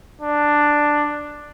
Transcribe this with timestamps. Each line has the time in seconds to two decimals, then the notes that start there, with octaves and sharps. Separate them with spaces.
0.21 D4